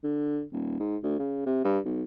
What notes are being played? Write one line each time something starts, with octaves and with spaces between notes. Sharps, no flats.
D3
D#1
G#2
D2
C#3
C3
G2
B1